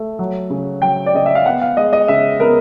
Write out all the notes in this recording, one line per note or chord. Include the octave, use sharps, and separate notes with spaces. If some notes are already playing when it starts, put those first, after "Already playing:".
Already playing: A3
F#3
C#3
F#3 G5
D5
C#3 D#5
E5
F5
B3 F#5
F5
G#3 D#5
D#5
C#3 E5
B3 A#4